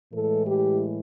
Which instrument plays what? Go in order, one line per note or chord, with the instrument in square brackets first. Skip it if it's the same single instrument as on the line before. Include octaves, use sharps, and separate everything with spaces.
[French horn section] A2 E3 G#3 A4
G4